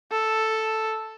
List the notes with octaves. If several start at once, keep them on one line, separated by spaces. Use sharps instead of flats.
A4